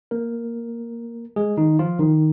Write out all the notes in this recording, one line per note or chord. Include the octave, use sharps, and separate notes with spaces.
A#3 A#4
G#3 G#4
D#3 D#4
F3 F4
D#3 D#4